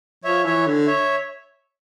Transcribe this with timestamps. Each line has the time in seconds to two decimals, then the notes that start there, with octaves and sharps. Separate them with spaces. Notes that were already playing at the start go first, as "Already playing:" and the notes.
0.24 F3 C#5 E5
0.45 E3 C#5 E5
0.67 D3
0.87 C#5 E5